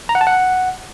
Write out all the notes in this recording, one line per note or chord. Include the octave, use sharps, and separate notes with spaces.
A#5
F#5
A5
F#5